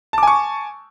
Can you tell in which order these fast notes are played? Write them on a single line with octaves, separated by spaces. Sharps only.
A5 D6 G#5 C#6